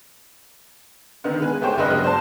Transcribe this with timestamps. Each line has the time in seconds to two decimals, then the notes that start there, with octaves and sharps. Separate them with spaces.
1.24 D3 D#3 B3
1.40 G#3 B4 G#5
1.61 A3 B3 G4 C5 C#5 G5
1.78 F#1 G2 C#3 D4 B4 D#5
1.90 F#3
2.04 C5 D5 A5 C6